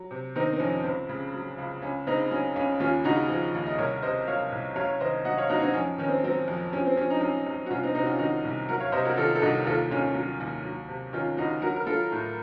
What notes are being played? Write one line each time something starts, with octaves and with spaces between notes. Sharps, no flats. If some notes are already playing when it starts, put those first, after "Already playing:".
Already playing: F#3
C3
D#3 C4 D#4
C4
F2 C#4
C#2 C4
C#3
F#3
C#2
C#2 C#4
C#3 C4 D#4
F#3 C#4
C#2 C#4
D#2 C#4 F4
C#3 D#4 F#4
F3
D#2
D#5
C2 A#4 C#5
C3 C5 D#5
F#3 C#5 F5
C2
F#2 C#5 F5
C#5
D#3 C5 D#5
F#3 D#5 F#5
C#5 F5
F#2 D#4 F#4
C4 D#4
F2 C#4
D#3 C#4
C4
F#3 C4
F2
F3 C#4
C4
F3 C#4
D#4
F#2 C#4
F#2
F#4
C2 C#4 F4
C4 D#4
C3 C4 D#4
F#4
C#4 F4
D#3 D#4 F#4
C2
F#3 F#4 A#4
C#5 F5
C3 C5 D#5
F#4 A#4
D#3 F4 A4
A4
C2 D#4 F#4
D#2 F4 A4
D#3 C#4 F4
F#3
D#2
F#3
C3
D#3 C#4 F4
C#2 D#4 F#4
F#3 F#4 A#4
A#4
F#3 F4 A4
A2